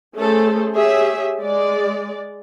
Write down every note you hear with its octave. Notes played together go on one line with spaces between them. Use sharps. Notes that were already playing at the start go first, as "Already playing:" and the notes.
A3 C#4 G#4 A4 C5
G4 G#4 C#5 E5
G#3 D5